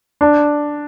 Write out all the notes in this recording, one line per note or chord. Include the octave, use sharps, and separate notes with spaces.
D4